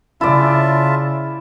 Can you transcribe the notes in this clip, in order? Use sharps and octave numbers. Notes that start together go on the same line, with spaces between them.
C#3 E4 F4 D5 E5 A5